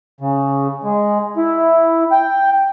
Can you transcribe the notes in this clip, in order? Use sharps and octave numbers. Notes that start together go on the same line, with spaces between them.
C#3
G#3
E4
G5